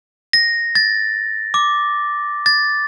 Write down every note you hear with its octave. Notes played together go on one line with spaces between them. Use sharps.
A#6
A6
D6
A6